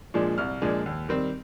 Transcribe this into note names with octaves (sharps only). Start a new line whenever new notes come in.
A#2 F3 G#3 D4
C2 F6
A#2 F3 G#3 D4
D#2
D#3 G3 C4